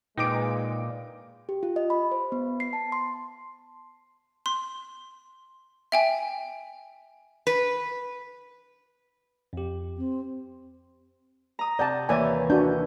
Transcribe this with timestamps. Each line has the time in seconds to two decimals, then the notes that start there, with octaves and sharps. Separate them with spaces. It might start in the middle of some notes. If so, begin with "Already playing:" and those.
0.18 A#2 G#3 D#4 B4 G5 D6 D7
1.49 G4
1.63 F4
1.76 D#5
1.90 B5
2.12 C5
2.32 B3
2.60 C7
2.73 A5
2.92 C6
4.46 C6
5.92 E5 G5 G#5
7.47 B4
9.53 F2 G4
9.98 C4
11.59 A#5 D#6
11.79 C3 D5 F#5 A5 G6
12.09 D#2 E3 C#5 D5 G#5
12.50 D4 F#4 G6